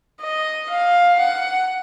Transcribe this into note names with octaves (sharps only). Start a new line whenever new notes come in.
D#5
F5
F#5